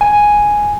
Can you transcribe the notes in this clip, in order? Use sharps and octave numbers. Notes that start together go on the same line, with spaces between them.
G#5